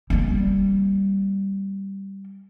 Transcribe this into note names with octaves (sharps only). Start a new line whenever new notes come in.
G3 A#3